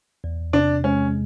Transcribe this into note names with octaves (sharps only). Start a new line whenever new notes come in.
E2
C3 D4
G#3 C#4